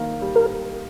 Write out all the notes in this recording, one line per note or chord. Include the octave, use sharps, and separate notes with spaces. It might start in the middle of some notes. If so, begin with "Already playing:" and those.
Already playing: D#3 A#3
G3
A#4